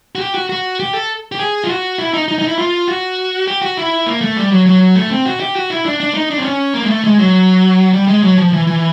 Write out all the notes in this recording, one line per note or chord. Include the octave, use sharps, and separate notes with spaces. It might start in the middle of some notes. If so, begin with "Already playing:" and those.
F#4
G4
F#4
F#4
G4
A4
G4
G#4
F4
F#4
E4
D#4
D#4
D#4
E4
F4
F#4
G4
F#4
E4
A#3
A3
G3
F#3
F#3
A3
C4
F#4
G4
F#4
E4
D4
D4
D#4
D4
C4
C#4
A#3
G#3
A3
G#3
F#3
G3
G#3
F#3
F3
E3
E3